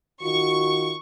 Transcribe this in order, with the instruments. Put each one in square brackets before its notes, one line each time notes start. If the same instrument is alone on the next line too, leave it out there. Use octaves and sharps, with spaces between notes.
[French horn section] D#3 F4 F#4 [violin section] C#6